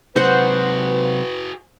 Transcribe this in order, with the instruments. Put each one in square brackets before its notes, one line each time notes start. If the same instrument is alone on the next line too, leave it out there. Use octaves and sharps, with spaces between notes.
[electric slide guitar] C3 F#3 [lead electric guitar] F#4 G#4 [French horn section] B4 [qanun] C5 F#5